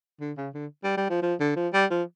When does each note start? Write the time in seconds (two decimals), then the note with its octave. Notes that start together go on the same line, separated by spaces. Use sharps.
0.21 D3
0.37 C#3
0.54 D3
0.84 G3
0.97 G3
1.10 F3
1.22 F3
1.40 D3
1.56 F3
1.73 G3
1.90 F3